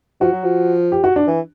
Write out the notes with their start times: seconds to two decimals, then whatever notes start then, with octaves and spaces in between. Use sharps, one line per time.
0.21 F3 F#4
0.33 F#3
0.44 F3
0.92 G4
1.04 F#4
1.16 D4
1.27 E3